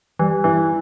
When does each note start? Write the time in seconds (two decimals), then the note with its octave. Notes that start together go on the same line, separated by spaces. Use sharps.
0.19 E3 G3
0.44 E3 E4